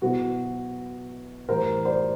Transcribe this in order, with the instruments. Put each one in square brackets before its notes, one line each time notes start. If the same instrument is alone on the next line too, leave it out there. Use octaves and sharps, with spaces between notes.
[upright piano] B2 F#3 B3 E4 F#4
A2 E3 G3 A#4 C5
C5 D5